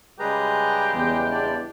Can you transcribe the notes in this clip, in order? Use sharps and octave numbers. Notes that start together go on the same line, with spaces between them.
C#3 G3 G#3 G4 G#4 B4 A#5
E2
D4 D5